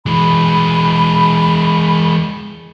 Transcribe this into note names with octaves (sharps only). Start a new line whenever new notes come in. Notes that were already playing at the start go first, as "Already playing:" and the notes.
E3 G#3 B5